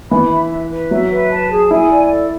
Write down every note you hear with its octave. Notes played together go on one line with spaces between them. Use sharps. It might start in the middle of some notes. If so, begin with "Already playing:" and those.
E3 B5
E5
B4
B4
F#3 E5
B4
A5
G#4
E4 G#5
D5
A4